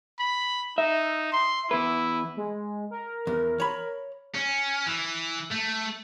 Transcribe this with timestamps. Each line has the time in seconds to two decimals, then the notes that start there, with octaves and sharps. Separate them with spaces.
0.19 B5
0.78 D#4 E5
1.32 C6
1.71 E2 E4 B4
2.37 G#3
2.91 A#4
3.27 E2
3.60 C#5 B5
4.35 C#4
4.86 E3
5.51 A3